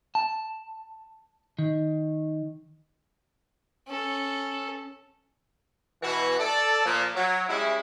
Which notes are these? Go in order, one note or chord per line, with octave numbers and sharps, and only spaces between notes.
A5
D#3
C#4 A4
B2 E3 F#4
A4 D5
A#2 F3 A#3
F#3
G3 G#3 C#4 E4